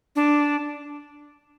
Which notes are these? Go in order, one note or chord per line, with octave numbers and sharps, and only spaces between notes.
D4